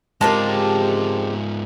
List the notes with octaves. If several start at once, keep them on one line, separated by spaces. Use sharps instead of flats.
G#2 G#3 C4 F4 G4 A#4 A5